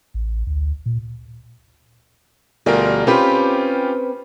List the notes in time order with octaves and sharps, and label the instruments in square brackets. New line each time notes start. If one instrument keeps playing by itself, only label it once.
[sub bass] A1
D2
A#2
[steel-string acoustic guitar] D2 G3 [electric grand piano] B2 F4 A#4
[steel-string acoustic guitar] C4 B4 [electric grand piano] C#4 F4 G4